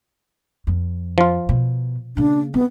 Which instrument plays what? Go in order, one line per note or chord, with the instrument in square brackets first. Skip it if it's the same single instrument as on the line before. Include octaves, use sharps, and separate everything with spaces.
[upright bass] F2
[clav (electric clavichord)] F3 F4
[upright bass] B2
[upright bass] C#3 A#3 [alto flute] D4
[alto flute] B3 [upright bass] C4